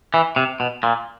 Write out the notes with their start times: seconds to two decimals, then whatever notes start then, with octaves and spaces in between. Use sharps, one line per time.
0.14 E3
0.36 C3
0.60 B2
0.83 A#2